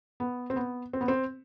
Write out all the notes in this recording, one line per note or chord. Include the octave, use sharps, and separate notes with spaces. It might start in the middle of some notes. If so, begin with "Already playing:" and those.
B3
C4
B3
C4
B3
C4